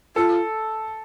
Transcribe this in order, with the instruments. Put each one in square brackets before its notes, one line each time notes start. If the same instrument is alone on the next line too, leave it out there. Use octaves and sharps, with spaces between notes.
[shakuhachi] F4 [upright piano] A4